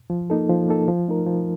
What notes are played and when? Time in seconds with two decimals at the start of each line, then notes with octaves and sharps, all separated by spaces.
0.10 F3
0.30 A#3 D#4 A4
0.49 F3
0.68 A#3 D#4 A4
0.88 F3
1.08 A3 D#4 A#4
1.26 F3